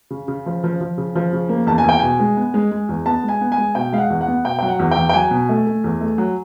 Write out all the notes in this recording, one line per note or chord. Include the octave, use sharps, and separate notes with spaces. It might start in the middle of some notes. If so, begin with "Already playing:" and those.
C#3
C#3
F3
F3
F3
C#3
F3
C#3
A#3
E2 A5
G#5
E2 G5
B2 G#5
G#3
B3
G#3
G#3
E2
B3 A5
G#3 G#5
B3
G#5
G#3
B2 G5
G#3 F5
F#5
E2
F#5
B3
B2 G5
F#3 G5
F#5
E2
G5
E2
G5
F#3 G#5
B2
A3
A3
E2
A3
F#3